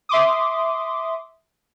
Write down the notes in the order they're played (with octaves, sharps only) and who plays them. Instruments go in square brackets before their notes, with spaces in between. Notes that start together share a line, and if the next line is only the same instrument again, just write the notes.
[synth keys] E5 C6 D6 D#6